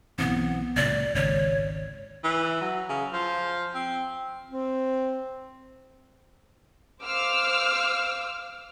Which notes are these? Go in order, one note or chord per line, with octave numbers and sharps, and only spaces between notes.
B1 E3 B3 C4
C#2 A#2 D5
G#1 C#2 C#5
E3
F#3
C#3
F3
C4
C4
C5 F5 D6 E6 F6